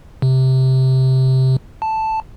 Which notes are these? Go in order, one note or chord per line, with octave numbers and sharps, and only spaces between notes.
C3
A5